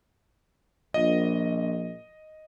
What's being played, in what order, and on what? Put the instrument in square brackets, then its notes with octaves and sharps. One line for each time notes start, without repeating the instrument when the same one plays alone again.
[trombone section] A#1 [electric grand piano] D#5